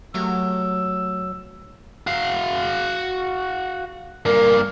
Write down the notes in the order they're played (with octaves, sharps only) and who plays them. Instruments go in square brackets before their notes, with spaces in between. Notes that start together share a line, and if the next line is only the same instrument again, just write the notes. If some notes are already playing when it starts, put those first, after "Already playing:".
[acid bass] F#3 [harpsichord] A3 G4 A#4 [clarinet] E6
[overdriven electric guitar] F#4 F5
[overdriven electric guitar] G2 A#3 [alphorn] A#4